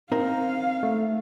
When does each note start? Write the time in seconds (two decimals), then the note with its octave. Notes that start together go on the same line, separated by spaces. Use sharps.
0.12 C4 D#4 A#4 F5
0.83 A3